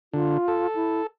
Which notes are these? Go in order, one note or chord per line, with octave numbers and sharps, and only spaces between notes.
D3 F4
A4
E4